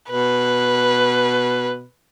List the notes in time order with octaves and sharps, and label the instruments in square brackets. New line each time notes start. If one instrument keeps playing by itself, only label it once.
[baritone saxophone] B2 [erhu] B4